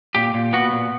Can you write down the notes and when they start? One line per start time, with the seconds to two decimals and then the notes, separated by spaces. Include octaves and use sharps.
0.15 A#2 G4
0.34 A#2
0.53 B3 F#4
0.73 A#2